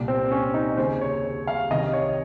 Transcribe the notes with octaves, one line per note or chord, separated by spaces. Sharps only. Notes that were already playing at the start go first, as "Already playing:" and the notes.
Already playing: C2 A#2
C4
C#4
D#4
D#2 C#3 C5
C#5
F5
C2 C3 D#3 D#5
C#5